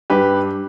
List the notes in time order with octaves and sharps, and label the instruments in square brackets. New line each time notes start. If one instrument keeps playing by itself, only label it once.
[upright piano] G2 G4 B4